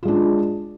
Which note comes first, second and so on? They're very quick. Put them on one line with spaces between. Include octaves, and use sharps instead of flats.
F4 G#3 D4